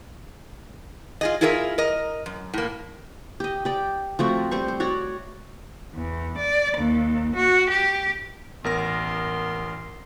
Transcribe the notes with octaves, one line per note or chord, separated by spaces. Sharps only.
F4 G#4 D#5
E4 F4 G#4 A#4 C5 E5
A#4 D#5
F#2
A2 A#3
G4 D#5
G4 D5
F3 A3 C4 F#4
G3 C4 C5 C#6
C5
F#4 C#5 D5
E2
D5
D#2
F#4
G4
A1 B3 A#4 C6 A#6